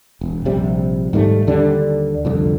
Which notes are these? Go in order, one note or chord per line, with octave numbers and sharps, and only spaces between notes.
E1
A#1 C3 G3
G#2 D#3 G3 A3
D#2 D3 G3 D4
C2 F2 D3